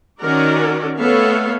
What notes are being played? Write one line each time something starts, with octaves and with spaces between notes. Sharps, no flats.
D#3 C#4 F#4 A#4 D5
A3 B3 A4 C#5 E5 F5